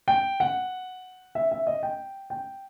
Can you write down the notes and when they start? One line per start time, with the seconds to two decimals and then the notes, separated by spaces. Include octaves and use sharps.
0.08 G5
0.40 F#5
1.35 E5
1.51 E5
1.67 D#5
1.83 G5
2.30 G5